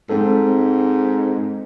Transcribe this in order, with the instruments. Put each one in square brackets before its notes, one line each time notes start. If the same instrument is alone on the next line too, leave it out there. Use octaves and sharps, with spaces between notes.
[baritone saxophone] G#2 [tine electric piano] G#3 C4 A4